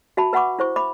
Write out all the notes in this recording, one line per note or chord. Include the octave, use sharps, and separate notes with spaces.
F#4 E5 A5 B5
B4 E5 F#5 B5 C#6 D6
E4 C5 C#6
E5 B5 D6